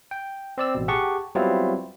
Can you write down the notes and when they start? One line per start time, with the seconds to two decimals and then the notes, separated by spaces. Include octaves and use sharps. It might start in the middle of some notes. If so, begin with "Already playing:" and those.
0.11 G5
0.58 C4 D5 E6
0.75 A1 B2
0.88 G4 G#4 F#5 A5 C#6
1.35 F#3 G3 B3 C4 E4 F4